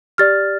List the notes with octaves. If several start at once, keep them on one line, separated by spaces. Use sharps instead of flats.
G4 D5 F6 A6